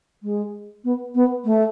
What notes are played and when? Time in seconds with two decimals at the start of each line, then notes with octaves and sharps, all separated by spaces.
0.23 G#3
0.84 B3
1.14 B3
1.45 A3